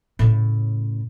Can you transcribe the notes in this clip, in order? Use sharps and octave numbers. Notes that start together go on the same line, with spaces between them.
A2 C#3